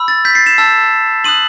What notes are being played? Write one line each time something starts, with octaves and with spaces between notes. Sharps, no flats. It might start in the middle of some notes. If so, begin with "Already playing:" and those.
Already playing: B5 E6
A6
G6 B6
A6 C7
C7 E7
A5 E6 G6
C6 D#6 F#6 D#7 F#7